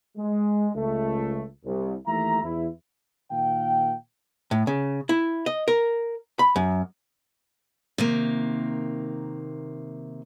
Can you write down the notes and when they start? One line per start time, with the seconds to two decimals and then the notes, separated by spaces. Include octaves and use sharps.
0.17 G#3
0.74 C#2 A3
1.65 C2
2.07 D#2 E3 A3 E5 A#5
2.42 E2 E4
3.30 A#2 D#3 F5 G5
4.51 A2
4.67 C#3
5.09 E4
5.46 D#5
5.68 A#4
6.39 B5
6.56 F#2
7.98 C3 D#3 A#3